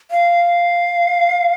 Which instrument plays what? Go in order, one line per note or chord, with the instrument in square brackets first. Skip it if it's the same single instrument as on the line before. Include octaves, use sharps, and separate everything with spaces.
[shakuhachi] F5